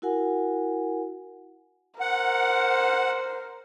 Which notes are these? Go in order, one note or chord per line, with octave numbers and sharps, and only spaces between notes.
E4 F#4 A#4 F#5 G#5
A#4 C5 F#5